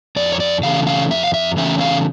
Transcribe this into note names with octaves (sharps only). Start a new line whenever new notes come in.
F2 D5
C#5
D5
C#3 E3 A3 C#4 F5
F5
F2 E5
F5
E5
C#3 E3 A3 C#4 E5
F5